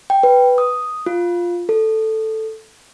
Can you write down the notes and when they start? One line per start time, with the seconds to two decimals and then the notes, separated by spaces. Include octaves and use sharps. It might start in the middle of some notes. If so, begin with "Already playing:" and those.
0.10 G5
0.23 B4
0.58 D#6
1.06 F4
1.69 A4